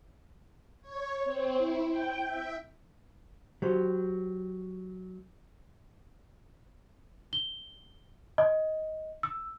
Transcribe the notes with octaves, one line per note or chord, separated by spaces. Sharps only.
C#5
C4
E4
G5
E5
F#3 G4 C5
G7
D#5
E6